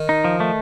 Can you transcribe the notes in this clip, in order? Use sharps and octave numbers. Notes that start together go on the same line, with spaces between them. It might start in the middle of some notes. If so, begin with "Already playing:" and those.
Already playing: D#3
D#4
F3
A3